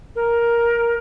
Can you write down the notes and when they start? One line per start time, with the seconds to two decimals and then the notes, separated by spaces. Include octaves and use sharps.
0.15 A#4